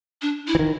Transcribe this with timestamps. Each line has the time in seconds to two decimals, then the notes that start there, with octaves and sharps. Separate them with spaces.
0.22 D4
0.47 E4
0.55 E3
0.59 D#3